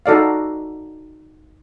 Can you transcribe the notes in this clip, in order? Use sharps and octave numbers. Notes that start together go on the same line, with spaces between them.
D#4 F#4 A4 D5 F5